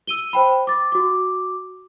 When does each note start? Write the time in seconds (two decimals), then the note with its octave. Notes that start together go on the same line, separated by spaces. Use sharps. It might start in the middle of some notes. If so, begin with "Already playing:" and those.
0.07 E6 D#7 G7
0.33 C5 G5 B5
0.67 D6 A6
0.92 F#4 D6